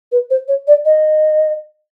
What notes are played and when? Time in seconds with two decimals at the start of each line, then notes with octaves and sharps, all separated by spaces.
0.12 B4
0.30 C5
0.48 C#5
0.67 D5
0.85 D#5